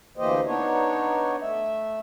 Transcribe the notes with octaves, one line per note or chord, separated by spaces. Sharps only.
D2 E3 A#3 G4 C5 D#5
B3 D4 D#4 C#5
A3 E5